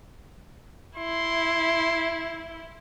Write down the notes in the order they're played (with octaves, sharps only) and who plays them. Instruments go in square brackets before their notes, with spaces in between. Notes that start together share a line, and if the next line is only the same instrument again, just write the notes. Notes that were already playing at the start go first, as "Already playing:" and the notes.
[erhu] E4 [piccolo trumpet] C6